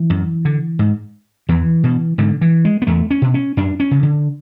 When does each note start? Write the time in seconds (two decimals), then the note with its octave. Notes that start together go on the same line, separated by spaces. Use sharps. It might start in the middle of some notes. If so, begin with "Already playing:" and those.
Already playing: E3
0.10 F#2
0.45 D3
0.79 G#2
1.49 E2 E3
1.84 B2
2.18 G#2 D3
2.41 E3
2.65 G#3
2.82 B3
2.87 E2 A3
3.11 C#4
3.22 B2
3.34 C#4
3.57 F#2 D4
3.80 C#4
3.91 C#3
4.03 D3